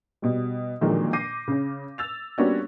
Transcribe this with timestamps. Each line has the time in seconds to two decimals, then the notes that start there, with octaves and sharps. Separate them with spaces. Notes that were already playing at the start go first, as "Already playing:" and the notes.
0.22 B2 G3
0.81 A#2 D3 D#3 F3 F#3 G#3
1.13 D6 G6 A#6 C7 D#7
1.48 C#3 C#4
1.98 E6 A6 F7
2.38 G3 A#3 B3 C#4 D4 F#4